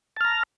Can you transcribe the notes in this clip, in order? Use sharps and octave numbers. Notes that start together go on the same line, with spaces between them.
A5 A#5 F6